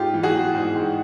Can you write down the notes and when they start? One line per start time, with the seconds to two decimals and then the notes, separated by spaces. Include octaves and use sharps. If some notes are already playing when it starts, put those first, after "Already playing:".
Already playing: G#2 F4 G4
0.13 E3
0.23 F#4 G#4
0.34 E3
0.55 G#2
0.76 G#2